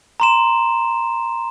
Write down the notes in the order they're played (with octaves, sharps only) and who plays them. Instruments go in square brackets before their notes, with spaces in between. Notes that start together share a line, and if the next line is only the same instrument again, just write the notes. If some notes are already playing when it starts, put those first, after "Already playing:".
[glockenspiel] A#5 C6 E7